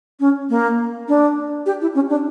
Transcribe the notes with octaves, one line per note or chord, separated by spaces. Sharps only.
C#4
A#3
D4
G4
E4
C#4
D4